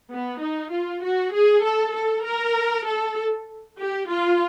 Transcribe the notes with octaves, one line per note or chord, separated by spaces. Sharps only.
B3
D#4
F4
F#4
G#4
A4
A4
A#4
A4
G4
F4